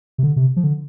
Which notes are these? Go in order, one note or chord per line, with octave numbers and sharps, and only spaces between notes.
C3
D3
C3
F3
D3